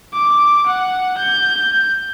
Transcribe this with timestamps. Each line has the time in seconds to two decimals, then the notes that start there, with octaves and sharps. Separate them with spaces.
0.13 D6
0.67 F#5
1.18 G6